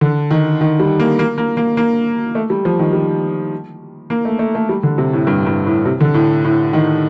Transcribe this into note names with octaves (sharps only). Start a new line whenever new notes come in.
D3
D#3
D#3
G3
A#3
A#3
A#3
A#3
A#3
A3
G3
F3
D#3
G3
A#3
A3
A3
A3
G3
D3
C3
A2
G2
G2
A2
C3
D3
A2
A2
D#3